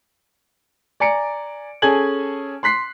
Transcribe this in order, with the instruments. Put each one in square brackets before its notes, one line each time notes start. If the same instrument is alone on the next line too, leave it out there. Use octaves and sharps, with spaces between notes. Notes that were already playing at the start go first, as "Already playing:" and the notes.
[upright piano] D5 G#5 A#5 C#7 D7
C#4 G#4 A4 G#5 G#6 F#7
C6 F#6 B6 C7